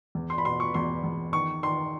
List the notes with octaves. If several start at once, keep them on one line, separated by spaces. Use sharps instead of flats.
E2
C6
B5
B2 C6
C#6
E2 C6
E2
D#3 C#6
D#3 C6